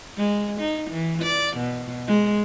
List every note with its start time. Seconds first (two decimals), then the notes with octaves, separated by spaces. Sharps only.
0.17 G#3
0.60 D#4
0.91 E3
1.22 D5
1.57 B2
2.07 G#3